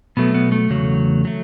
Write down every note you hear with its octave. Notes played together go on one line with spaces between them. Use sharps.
B2 F#3 A3 B3
B3
A3
E2 C#3 F#3
F#3 A3